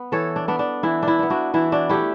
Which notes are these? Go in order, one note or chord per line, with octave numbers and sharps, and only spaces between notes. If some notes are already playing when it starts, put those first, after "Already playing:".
Already playing: B3
E3 A4 C#5
D4
B3 D4
D4
E3 E4
D4 E4
B3 D4
D4 F#4
E3 E4
D4 F#4
A3 D4 E4 G4